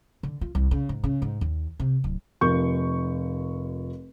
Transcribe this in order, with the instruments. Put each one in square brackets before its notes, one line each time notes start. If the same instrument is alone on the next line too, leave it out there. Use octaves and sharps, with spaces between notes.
[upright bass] D3
F4
C2
C#3
G#2
C#3
G#2
D#2
C3
D1
[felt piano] F1 F3 A#4 C#6 G6